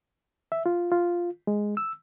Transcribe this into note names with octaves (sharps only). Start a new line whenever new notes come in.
E5
F4
F4
G#3
E6